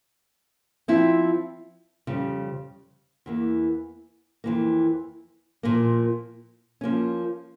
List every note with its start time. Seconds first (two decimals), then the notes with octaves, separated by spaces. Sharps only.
0.88 F3 C4 E4
2.07 F2 C#3 G3
3.26 E2 E3 A#3
4.44 F2 E3 A#3
5.63 A#2 F3 A#3
6.81 F3 A#3 C#4